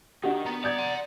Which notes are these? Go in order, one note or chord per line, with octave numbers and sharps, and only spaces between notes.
D#3 D4 F#4 G4 F#5
B3 A#5
D5 D#6 G6 G#6
F#5 C6